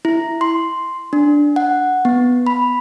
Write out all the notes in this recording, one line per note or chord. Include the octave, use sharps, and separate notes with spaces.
E4
C6
D4
F#5
B3
B5